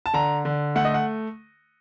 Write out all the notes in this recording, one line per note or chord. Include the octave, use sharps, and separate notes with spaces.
A5
D3 A#5
D3
A3 F#5
D#5
F#5